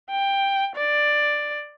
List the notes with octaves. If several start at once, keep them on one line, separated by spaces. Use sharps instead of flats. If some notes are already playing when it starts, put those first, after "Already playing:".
G5
D5